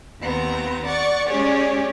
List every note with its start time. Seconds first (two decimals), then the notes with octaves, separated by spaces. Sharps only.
0.21 D#2 B3 C4 A#5
0.85 D5 F#5 C#6
1.28 G#3 C#4 G4 G#4 C#5 D5